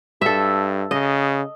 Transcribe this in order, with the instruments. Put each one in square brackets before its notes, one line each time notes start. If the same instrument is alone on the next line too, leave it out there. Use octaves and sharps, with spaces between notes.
[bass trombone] G2 [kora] A4 E5
[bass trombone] C#3 [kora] D#5